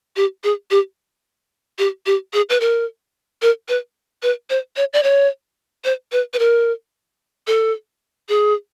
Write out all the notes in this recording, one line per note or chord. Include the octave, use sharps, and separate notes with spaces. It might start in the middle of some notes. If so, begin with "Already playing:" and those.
G4
G#4
G4
G4
G4
G#4
B4
A#4
A#4
B4
B4
C5
C#5
D5
C#5
C5
B4
B4
A#4
A4
G#4